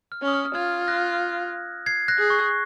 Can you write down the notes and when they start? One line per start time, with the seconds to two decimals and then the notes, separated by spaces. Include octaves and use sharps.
0.12 F6
0.23 C#4 D#6
0.33 F6
0.55 F4 F6 G#6
0.88 F#6 A#6
1.86 G#6 C7
2.08 F#6 A#6
2.19 G#4
2.30 C#6